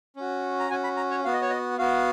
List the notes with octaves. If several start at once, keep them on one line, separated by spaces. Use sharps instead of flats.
C#4 F#4
A#5
C#4 F#4 G#5
B5
A#5
C#5
B3 F#4 F5
D#5
C#5
D#5
B3 F#4 F5